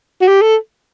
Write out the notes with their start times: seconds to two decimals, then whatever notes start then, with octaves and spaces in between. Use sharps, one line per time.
0.21 F#4
0.28 G4
0.42 A4